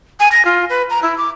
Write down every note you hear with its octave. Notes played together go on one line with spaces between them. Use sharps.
G#5
A#6
F4
B4
A#5
E4
D6